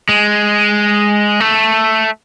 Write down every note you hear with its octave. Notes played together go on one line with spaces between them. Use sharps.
G#3
A3